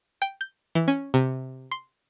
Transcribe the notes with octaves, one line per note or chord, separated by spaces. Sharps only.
G5
G6
E3
C#4
C3
C6